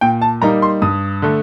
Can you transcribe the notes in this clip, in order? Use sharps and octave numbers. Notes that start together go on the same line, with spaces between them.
A#2 G5
A5
G3 A#3 D#4 A#5
C6
G2 D#6
D3 A3